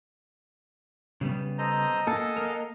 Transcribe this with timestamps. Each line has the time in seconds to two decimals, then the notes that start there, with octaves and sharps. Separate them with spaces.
1.21 C#3 G3 B3
1.58 A4 C5 D#5 A#5
2.07 A#3 A4 F#5 G#5
2.37 A#3 A#4